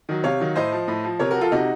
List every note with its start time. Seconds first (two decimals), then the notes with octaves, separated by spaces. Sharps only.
0.09 D#3 F#3
0.24 C3 C#5 F5
0.40 D#3 F#3
0.56 A2 C5 D#5
0.72 F3
0.88 A2
1.04 F3
1.19 C3 A#4 C#5
1.31 F#4 A#4
1.36 F3 F4 A4
1.51 C3 D#4 F#4